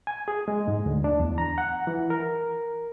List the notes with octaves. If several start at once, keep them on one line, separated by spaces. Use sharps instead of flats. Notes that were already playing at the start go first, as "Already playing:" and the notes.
G#5
G#4
G#3
G#2
D2
D4
E2
A#5
F#5
E3
A#4